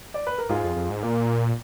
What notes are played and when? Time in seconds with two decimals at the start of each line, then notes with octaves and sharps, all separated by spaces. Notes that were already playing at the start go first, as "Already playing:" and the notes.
0.14 D5
0.27 B4
0.38 A#4
0.49 G#2 F4 G#4
0.64 F2
0.76 F2
0.90 G#2
1.03 A#2 A#3